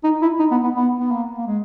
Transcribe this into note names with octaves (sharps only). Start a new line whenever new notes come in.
D#4
E4
D#4
B3
B3
B3
B3
A#3
A#3
G#3